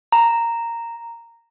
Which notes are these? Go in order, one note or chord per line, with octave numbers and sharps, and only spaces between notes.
A#5